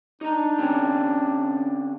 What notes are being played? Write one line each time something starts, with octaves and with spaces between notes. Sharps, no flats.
D4 D#4 A#5
D3 C4 C#4